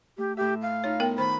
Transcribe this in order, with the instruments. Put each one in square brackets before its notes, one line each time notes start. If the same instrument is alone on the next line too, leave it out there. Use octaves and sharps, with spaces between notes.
[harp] A3 [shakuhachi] G4
[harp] A2 E5 [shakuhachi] G4
[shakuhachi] F5
[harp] D#4 F4 [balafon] C#5
[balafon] B3 A#4 G5
[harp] D#3 [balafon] C5 [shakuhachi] B5